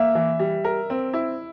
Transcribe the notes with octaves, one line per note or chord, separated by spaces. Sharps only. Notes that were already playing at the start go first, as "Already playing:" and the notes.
Already playing: A#3 E5
E3
G3
A#4
C4
E4